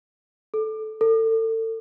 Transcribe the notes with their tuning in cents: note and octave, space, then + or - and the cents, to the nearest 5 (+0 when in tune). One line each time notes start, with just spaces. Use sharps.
A4 -15
A4 +30